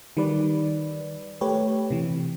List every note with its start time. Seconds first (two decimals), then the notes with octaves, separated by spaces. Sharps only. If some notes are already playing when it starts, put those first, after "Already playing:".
0.17 D#3 G3 B4 D5
1.41 A3 G4 B4 C#5
1.90 C3 E3